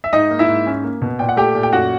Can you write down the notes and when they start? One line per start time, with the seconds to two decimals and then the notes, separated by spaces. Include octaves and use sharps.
0.04 E5
0.13 G#2 D#4 D#5
0.31 A#3
0.39 E4 E5
0.48 G#2
0.66 C#4
0.84 A#3
1.02 B2
1.19 A#2 G5
1.29 F#5
1.37 A3 G4 G5
1.55 A#2
1.63 G5
1.73 F#2 F#4 F#5